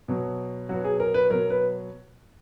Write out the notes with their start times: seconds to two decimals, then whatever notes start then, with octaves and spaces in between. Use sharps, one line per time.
0.08 B2 F#3
0.69 B2 F#3 F#4
0.84 G#4
1.00 A#4
1.14 B4
1.30 B2 F#3 A#4
1.50 B4